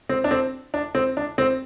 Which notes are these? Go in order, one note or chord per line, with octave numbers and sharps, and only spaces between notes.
C4
D4
C4
D4
C4
D4
C4